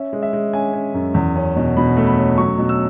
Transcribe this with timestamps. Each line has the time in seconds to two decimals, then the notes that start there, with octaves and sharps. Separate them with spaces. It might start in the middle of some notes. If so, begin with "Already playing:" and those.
Already playing: C#4 E5
0.13 G#3
0.22 E5
0.33 G#3
0.53 C#4 G#5
0.73 C#4
0.94 F#2
1.14 E2
1.36 C#4
1.56 B2
1.77 B2 B5
1.97 A3
2.07 B5
2.18 C#4
2.38 F#3 C#6
2.58 B2
2.69 E6